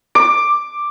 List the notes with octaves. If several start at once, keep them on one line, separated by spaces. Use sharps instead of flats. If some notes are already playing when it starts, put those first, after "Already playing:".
D6